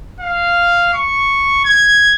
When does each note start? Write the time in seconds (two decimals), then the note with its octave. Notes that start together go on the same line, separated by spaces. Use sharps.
0.20 F5
0.94 C#6
1.65 G#6